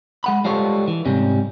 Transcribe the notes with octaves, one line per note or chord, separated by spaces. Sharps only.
G#3 F#5 B5
G3 G#3 F4 A4 C5 C#5
E3
G#2 C3 G3 C#4